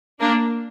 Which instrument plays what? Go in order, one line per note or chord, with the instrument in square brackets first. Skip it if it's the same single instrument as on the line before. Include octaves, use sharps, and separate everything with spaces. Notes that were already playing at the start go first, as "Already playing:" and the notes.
[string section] A#3 D4